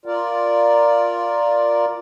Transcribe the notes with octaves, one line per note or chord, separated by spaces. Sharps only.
F4 A#4 D5